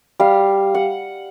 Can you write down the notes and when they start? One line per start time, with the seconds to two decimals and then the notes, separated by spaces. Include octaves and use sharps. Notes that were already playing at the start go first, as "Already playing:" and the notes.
0.20 G3 F5
0.75 F#5